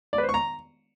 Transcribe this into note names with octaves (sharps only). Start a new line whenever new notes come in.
D5
B4
C5
C#6
A#5